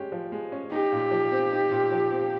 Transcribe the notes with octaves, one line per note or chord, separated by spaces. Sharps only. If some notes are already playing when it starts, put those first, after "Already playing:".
Already playing: G#3 C#4 G4
F3
G#3
C#4
D#4 G4
A#2
F3
C4
D#4
A#2
F3
C4